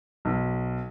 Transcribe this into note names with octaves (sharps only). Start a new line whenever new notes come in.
B1